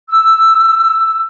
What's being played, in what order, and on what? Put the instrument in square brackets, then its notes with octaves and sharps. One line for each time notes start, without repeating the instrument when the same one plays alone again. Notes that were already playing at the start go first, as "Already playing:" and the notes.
[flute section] E6